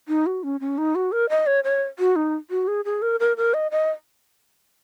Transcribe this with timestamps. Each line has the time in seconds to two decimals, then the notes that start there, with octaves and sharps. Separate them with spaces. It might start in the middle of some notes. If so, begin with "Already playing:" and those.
0.08 D#4
0.26 F#4
0.43 C#4
0.61 C#4
0.78 D#4
0.95 F#4
1.12 A#4
1.29 D#5
1.47 C#5
1.64 C#5
1.99 F#4
2.16 D#4
2.50 F#4
2.68 G#4
2.85 G#4
3.02 A#4
3.20 A#4
3.37 A#4
3.54 D#5
3.71 D#5